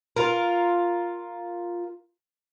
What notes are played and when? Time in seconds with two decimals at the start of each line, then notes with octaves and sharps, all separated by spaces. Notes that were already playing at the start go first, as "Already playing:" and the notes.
0.16 F4 A#4